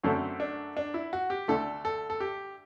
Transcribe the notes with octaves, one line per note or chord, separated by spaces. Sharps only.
F#2 D3 A3 C4
D4
D4
E4
F#4
G4
D2 D3 A3 A4
A4
A4
G4